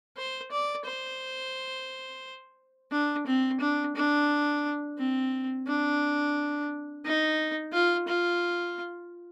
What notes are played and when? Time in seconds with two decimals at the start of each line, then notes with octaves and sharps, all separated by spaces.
0.17 C5
0.51 D5
0.86 C5
2.92 D4
3.27 C4
3.60 D4
3.96 D4
4.98 C4
5.67 D4
7.05 D#4
7.72 F4
8.08 F4